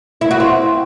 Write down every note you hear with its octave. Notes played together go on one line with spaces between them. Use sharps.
E4
F#4
C4